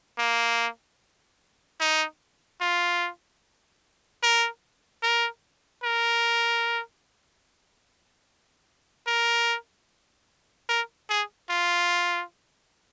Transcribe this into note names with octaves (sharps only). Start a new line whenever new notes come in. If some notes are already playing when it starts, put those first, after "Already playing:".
A#3
D#4
F4
A#4
A#4
A#4
A#4
A#4
G#4
F4